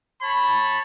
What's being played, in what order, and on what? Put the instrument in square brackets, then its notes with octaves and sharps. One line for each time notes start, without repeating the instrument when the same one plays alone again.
[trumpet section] C#5 A5 B5